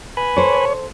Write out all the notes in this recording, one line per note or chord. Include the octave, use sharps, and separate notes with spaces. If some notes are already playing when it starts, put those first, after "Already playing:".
B4 G#5 B5
A4 C5 C#5